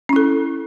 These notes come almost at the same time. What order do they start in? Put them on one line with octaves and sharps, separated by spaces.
C#4 E4 A4